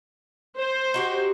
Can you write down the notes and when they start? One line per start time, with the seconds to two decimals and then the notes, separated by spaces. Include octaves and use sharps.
0.58 C5
0.94 D#4 F#4 G4